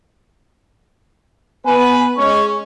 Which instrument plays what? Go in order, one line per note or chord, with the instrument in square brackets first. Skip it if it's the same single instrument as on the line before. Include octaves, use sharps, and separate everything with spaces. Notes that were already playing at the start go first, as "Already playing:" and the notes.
[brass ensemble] B3 B4 [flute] G#5
[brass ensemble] G#3 C#4 [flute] C#6